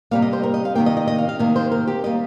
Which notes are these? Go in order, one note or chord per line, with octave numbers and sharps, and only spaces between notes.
C3 G3 A#3 F5
D#5
C5
A#4
D#5
F5
C3 D#3 A#3 G5
D#5
D#5
D#5
F5
F5
C3 D#3 A#3 D#5
C5
A#4
G4
G3 A#3 D#5